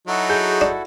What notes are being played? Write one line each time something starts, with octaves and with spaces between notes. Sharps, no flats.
F#3 D#4 E4 F#4 A4
G#4 G6
D4